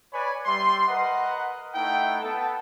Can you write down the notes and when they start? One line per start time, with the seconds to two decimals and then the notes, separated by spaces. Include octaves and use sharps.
0.13 B4 C#5 D5 G#5 B5
0.45 G3 E5 C6
0.88 A#4 B4 D#5 F#5
1.75 A3 D#4 E4 F#5 G5
2.21 B3 A4